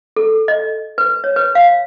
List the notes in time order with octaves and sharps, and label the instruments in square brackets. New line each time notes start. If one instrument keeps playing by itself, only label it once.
[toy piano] A4
D#5
B4
C#5
B4
F5